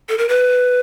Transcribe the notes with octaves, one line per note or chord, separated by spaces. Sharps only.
A4
A#4
B4